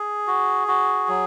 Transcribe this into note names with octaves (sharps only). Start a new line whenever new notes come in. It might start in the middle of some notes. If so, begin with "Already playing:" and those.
Already playing: G#4
F#4
F#4
F#3